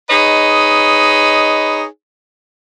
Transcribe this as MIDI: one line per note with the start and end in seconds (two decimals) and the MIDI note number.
0.10 1.83 63
0.10 1.83 68
0.10 1.83 71
0.10 1.83 73
0.10 1.83 75